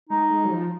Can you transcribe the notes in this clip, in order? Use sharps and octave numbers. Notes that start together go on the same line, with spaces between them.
G#3 D#4
G#3
F#3
F3